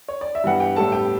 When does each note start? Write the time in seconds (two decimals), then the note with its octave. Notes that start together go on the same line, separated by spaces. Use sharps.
0.08 C#5
0.21 D5
0.35 E5
0.44 G2 E3 B3 F#5
0.60 G4 G5
0.76 A2 G3 B3 A4 A5
0.92 G4 G5